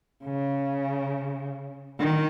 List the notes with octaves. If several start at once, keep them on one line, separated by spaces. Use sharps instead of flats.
C#3
D#3